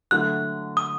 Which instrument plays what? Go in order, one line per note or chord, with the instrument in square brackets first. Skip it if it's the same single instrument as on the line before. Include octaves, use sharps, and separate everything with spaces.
[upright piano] D3 F#3 A3 [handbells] F#6
[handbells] D#6